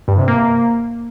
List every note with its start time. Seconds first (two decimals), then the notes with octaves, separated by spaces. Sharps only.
0.08 G2
0.18 C3
0.28 A#3